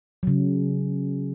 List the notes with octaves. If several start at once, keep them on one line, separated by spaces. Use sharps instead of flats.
C#3 F#3